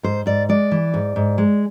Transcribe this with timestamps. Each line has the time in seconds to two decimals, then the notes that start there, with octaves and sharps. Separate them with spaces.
0.03 G#2 C5
0.26 G#2 D5
0.49 G#3 D5
0.71 E3
0.94 G#2
1.16 G#2
1.38 G#3